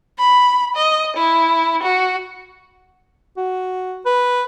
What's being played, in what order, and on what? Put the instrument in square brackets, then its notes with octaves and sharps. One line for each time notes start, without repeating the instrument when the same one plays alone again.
[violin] B5
D#5
E4
F#4
[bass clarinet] F#4
B4